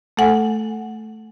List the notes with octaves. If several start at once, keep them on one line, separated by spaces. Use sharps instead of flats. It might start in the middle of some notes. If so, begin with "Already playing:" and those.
A3 A4 F#5 G#5